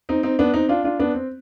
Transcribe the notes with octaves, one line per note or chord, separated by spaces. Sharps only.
C4 D#4
C4 D#4
B3 D4
C4 D#4
D4 F4
D4 F4
B3 D4
C4